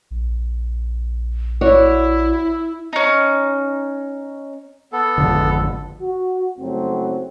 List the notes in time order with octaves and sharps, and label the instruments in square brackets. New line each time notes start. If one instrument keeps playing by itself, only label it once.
[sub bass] A#1
[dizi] E4 [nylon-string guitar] F#4 C#5 D5
[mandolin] C#4 D#4
[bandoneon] B3 A4
[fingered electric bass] G#1 F2 D3
[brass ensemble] F#4
F#1 F2 F#3 A3 C4